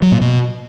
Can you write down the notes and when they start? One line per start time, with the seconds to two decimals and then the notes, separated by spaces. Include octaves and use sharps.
0.02 F#3
0.12 A#2
0.21 B2